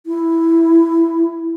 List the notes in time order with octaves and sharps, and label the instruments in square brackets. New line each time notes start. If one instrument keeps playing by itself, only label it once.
[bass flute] E4